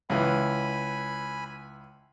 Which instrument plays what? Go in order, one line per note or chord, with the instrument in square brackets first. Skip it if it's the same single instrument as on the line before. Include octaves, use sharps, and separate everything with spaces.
[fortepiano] C#2 E3 [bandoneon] G#5 B5